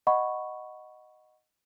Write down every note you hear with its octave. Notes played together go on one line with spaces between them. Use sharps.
D#5 F#5 B5 C#6